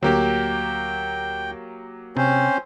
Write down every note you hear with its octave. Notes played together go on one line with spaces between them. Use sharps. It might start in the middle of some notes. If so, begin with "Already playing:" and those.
D2 F#3 A#3 G4 G5
C3 C4 C#4 C5